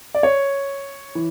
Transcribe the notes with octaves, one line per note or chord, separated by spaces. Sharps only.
D5
C#5
E3